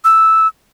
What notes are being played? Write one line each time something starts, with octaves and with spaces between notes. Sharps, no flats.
E6